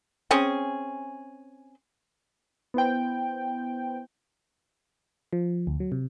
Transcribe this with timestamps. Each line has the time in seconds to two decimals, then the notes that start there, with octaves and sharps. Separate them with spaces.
0.31 C4 C#4 G#4
2.74 B3 E4 C5 G5
5.33 F3
5.67 D2
5.80 F#3
5.92 C3